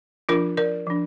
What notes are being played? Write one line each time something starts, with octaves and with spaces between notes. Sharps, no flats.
F3 D4 F4 A#4
A#4 D5
F3 D4